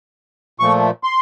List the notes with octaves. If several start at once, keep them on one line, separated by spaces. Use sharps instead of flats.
A#2 F3 A3 C#6
C6